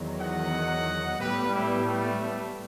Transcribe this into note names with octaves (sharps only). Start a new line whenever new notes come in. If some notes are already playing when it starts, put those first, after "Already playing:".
Already playing: E2 D#3 F#3
D#5 F#5
A2 G3 B3 G4 B4
E4 G4
A3